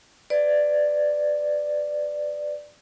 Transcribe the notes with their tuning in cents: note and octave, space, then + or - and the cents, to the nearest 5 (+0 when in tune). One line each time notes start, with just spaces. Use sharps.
B4 +30 D5 +10